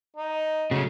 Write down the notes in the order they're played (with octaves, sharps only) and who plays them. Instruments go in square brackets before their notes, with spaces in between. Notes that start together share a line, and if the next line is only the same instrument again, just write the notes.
[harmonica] D#4
[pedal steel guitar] C#3 [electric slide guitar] F#3 A3 F#4